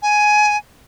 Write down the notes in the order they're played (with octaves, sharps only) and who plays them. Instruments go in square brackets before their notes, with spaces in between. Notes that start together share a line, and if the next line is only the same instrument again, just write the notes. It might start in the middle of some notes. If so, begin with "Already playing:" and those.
[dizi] G#5